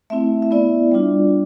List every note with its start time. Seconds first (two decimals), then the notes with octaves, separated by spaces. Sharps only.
0.10 A3 C4 E4 E5
0.42 E5
0.51 B3 E4 D5
0.92 G3 D4 F4